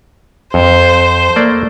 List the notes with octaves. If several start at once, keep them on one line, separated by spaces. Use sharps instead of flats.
F2 C5
A3 A#3 D5